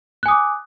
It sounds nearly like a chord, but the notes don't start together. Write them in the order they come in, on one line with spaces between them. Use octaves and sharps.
F#6 G#5 D#6 D6